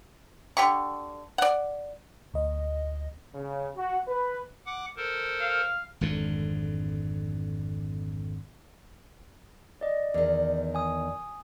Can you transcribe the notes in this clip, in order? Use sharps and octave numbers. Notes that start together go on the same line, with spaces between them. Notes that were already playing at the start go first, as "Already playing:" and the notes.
D3 G4 C#6
D5 F#5
D2 D#5
C#3
F#4
B4
F#5 D6
A4 A#4 C5
F5
G#1 F2 D3
D5 D#5
E2 D#3 D5
G#5 D#6